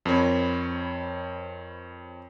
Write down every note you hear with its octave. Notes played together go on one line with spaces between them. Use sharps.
F2 C4 A#4 C#5 B5